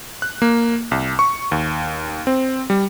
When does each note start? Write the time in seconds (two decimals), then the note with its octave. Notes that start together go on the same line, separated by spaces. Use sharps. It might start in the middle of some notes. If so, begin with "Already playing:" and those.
0.22 F#6
0.42 A#3
0.91 C2
1.19 C#6
1.52 D#2
2.27 C4
2.70 G3